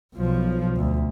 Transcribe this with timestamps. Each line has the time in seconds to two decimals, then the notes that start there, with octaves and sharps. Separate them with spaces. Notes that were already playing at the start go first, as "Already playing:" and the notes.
0.15 B1 F3
0.77 D2